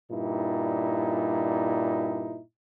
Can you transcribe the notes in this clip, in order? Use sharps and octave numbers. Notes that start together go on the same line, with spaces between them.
G2 A#2 D#4 E4